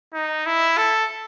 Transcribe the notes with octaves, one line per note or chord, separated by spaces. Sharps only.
D#4
E4
A4